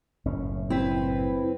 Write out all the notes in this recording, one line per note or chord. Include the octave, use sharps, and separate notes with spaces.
F#1 A2 C#4
C4 E4 B4